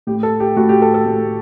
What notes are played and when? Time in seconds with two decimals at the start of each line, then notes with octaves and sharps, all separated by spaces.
0.07 A2 G4
0.23 A4
0.40 G4
0.56 A2 F#4
0.69 G4
0.82 A4
0.94 A4
1.06 A2